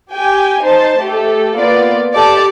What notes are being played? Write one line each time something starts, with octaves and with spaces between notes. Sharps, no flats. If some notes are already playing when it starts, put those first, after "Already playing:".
G4 G5 G#5
D#4 C5 A5
A3 G4 A4
A#3 B3 F4 D5
G4 A4 D5 A5 D6